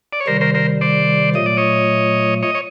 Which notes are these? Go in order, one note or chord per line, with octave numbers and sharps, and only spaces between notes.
D5
C#5
C3 D#3 G3 A#4 C5
A#4 C5
A#4 C5
C5 D5
A#2 F#3 A3 D#5
D5
C#5 D#5
C#5 D#5
C#5